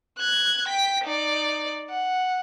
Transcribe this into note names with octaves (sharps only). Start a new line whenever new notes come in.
F#6 G#6
G5 B6
D#4 D5
F#5